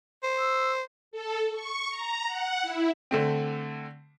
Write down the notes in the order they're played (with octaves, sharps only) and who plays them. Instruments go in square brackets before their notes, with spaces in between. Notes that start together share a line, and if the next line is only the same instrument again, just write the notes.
[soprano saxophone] C5
[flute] E6
[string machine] A4
C#6
A#5
F#5
E4
[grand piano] D3 A3 C4